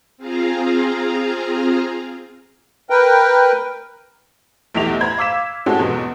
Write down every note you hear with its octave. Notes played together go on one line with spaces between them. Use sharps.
C4 F4 G#4 F5 A#5
A#4 B4 G5
B1 E2 A3 E4 G4 F7
C5 A#5 B5 G#6
F5 D6 E6 B6 E7
G#3 C4 C#4 F#4 G4 A4
E2 G#2 B2 F#3